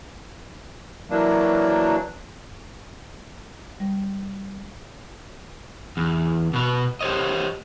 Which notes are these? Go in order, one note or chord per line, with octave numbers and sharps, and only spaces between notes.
E3 F#3 A#3 D4
G3
E2
B2 B4
G4 C5 C#5 D#5